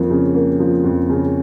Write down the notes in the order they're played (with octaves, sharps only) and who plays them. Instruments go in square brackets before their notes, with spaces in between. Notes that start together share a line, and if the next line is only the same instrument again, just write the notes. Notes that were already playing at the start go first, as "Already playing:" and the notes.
Already playing: [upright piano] F2 F3 A#3
C#3
A#3
F3
F2
C#3